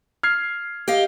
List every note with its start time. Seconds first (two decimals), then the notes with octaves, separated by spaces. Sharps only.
0.23 F6 G#6 C7
0.88 G4 D#5 F5